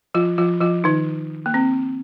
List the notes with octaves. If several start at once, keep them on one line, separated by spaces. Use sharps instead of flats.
F3 F4
F3 F4
F3 F4
D#3 D#4
A#3
C4